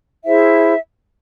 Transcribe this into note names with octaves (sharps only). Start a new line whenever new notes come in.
E4 G#4 C5 E5